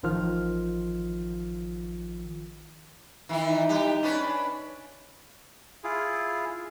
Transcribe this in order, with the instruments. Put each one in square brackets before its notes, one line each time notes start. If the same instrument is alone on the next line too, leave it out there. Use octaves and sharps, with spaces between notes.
[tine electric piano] A1 D#3 F3 F4 F6
[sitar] D#3 E3 E4
[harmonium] D#4
[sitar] G3 G4
C#4 D4 B4
[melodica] E4 F4 G#4